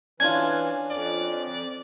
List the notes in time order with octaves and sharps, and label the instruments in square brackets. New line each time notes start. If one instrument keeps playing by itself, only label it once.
[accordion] E3 [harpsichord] C#4 D4 F4 [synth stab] G#6
[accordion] F2 [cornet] D5